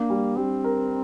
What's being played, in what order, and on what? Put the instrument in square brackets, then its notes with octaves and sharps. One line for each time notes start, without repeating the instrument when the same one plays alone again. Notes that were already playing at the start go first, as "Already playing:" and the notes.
Already playing: [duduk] A#3 [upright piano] D4
[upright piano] G3
[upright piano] G3 [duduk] C4
[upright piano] A#4